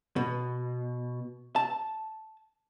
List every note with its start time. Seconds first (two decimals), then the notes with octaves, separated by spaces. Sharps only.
0.16 B2
1.56 A5